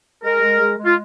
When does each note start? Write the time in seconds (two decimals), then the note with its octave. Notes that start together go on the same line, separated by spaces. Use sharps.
0.23 G#3 A#4
0.41 G#3
0.59 G#3
0.77 G#3
0.85 F4